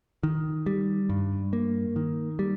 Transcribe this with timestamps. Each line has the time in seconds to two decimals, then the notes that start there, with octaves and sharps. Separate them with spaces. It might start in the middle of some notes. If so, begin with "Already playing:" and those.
0.23 D#3
0.66 G3
1.09 G2
1.53 A#3
1.96 D#3
2.39 G3